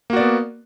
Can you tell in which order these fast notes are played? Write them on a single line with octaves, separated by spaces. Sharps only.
A#3 F#4 D5 B3